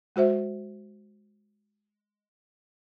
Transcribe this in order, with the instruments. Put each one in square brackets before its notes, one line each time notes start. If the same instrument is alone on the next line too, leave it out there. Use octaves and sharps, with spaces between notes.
[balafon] G#3 F#4 C5 E5